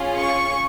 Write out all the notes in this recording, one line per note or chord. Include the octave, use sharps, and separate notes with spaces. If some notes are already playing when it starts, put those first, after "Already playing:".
Already playing: C#4 F4 G#4
C#6